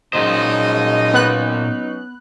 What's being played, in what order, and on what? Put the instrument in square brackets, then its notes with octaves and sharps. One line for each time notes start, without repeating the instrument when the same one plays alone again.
[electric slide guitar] A#2 C5 [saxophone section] F#3 C#4 D#4 [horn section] G#3 D#5
[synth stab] B3 F#6